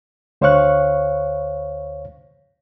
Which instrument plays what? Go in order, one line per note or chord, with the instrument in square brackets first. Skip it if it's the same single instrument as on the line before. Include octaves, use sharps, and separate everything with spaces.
[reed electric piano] D2 C5 C#5 F5 C#6 F#6